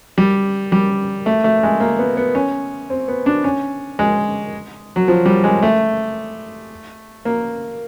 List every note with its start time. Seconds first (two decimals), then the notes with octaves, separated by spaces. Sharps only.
0.18 G3
0.72 G3
1.26 A3
1.44 A3
1.63 G#3
1.80 A#3
1.99 B3
2.17 B3
2.35 C#4
2.90 C4
3.08 B3
3.26 D4
3.44 C#4
3.99 G#3
4.96 F#3
5.08 F3
5.26 G3
5.44 G#3
5.62 A3
7.25 A#3